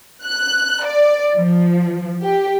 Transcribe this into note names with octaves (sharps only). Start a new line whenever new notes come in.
F#6
D5
F3
G4